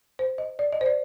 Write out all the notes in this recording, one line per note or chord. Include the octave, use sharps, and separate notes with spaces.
C5
D#5
D5
D#5
C5
D5